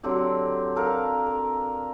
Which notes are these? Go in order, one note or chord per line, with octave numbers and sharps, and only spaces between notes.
D3 F#3 C4 G4
A4 A#4 F5 F#5
A#4